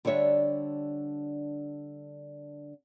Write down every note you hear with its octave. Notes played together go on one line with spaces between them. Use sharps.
D3 G3 D4 C#5 E5